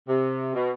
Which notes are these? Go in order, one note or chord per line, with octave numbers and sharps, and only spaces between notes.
C3
B2